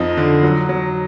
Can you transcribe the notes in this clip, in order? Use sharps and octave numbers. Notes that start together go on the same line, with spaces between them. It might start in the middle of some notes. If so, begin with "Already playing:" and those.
Already playing: F2 F3 D#4 D#5
D3
F#3
F#3